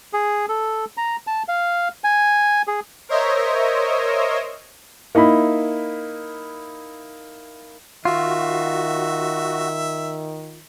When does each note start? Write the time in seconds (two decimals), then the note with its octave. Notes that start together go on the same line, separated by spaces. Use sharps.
0.13 G#4
0.49 A4
0.97 A#5
1.27 A5
1.48 F5
2.04 G#5
2.68 G#4
3.09 A#4 C5 C#5 D#5 E5
5.15 A#3 D#4 E4 B5
8.05 D#3 F4 F#4 E5